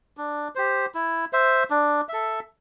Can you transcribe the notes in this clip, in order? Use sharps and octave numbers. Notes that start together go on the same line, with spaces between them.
D4
G4 C5
E4
C5 E5
D4
A4 E5